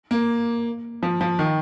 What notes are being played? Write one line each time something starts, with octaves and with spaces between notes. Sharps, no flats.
A#3
F3
F3
D#3